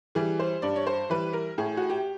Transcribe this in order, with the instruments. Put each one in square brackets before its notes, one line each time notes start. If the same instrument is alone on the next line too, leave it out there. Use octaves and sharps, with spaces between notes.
[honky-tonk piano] E3 G3 G#4
C5
G2 D5
C#5
C5
E3 G3 B4
A#4
A2 G#4
F#4
G4